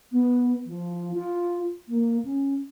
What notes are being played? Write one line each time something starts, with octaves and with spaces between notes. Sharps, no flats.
B3
F3
F4
A#3
C#4